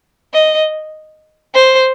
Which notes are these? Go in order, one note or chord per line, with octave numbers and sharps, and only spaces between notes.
D#5
C5